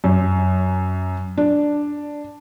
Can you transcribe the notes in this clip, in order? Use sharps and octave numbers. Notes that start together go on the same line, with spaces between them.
F#2
D4